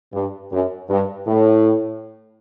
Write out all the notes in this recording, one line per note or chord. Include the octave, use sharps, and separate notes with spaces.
G2
F#2
G2
A2